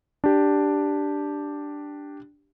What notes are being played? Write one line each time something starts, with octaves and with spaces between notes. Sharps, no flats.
D4 G4